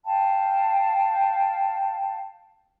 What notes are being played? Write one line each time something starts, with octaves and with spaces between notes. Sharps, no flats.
F5 G5 A5